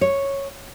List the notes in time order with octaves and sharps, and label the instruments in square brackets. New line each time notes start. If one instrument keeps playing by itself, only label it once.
[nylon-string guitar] C#5